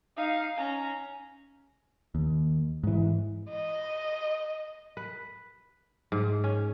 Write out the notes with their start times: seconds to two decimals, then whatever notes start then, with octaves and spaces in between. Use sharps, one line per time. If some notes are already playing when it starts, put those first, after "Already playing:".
0.16 D#4 F5
0.56 C#4 A#5
2.15 D#2
2.84 G#2 E3
3.50 D#5
4.97 B4
6.12 G#2
6.44 C#4